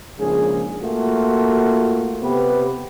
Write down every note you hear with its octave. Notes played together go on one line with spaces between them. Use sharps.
A#1 G#2 C#3 G#4
A3 A#3 F4 F#4
C3 B3 G4 B4